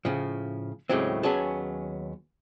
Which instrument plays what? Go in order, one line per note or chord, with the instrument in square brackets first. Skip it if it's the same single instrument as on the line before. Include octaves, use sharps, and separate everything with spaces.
[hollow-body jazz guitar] A2 C#3 F3
D#2 A2 C#3 F#3 G#3 C4
D#2 F#3 B3 C#4 G#4 A5